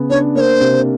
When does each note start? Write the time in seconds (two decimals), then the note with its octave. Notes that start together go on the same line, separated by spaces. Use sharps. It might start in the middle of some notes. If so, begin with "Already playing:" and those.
Already playing: C#3 B3
0.10 D4 C#5
0.35 A#3 C#5
0.41 C5
0.60 C3